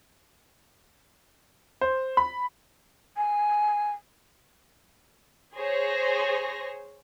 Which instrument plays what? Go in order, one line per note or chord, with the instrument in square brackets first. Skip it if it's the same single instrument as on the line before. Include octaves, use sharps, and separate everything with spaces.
[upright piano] C5
B5
[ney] G#5
[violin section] G#4 C5 C#5 A#6